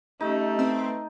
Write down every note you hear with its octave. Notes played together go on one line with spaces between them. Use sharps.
A3 C#4 D#4 G4 D#5
C4 B4